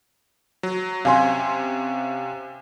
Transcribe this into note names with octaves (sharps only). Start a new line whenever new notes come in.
F#3
C3 C#4 F5 G#5 C6